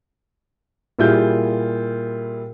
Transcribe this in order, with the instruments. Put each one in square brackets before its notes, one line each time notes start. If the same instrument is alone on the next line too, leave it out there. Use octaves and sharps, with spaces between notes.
[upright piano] A#2 G3 E4 F4 G#4 G6